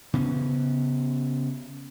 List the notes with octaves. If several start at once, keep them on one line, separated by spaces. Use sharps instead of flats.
C#3 B3 C#4